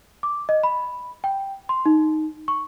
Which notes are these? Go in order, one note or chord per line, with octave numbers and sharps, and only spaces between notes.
D6
D#5
B5
G5
C6
D#4
C#6